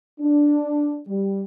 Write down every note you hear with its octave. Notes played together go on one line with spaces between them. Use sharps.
D4
G3